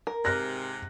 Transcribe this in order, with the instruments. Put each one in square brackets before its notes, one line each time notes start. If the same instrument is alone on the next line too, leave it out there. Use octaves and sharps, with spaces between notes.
[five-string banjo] A#4
[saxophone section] G#2 C3 [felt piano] F6 F#6 A#6